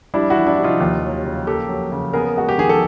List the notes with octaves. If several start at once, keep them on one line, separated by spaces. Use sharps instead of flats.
G3 D4 E4
E4 F#4
E3
D4 E4
C3
D#4 F4
D#2
F#3
C#3
A#3 G4 A4
F#3
C#3
B3 G#4 A#4
G#3 F#4
G4
D#3 G#4
A4